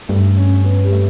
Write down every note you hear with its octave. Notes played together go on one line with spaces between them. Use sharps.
G2 A3
C#4
B3
G3
A3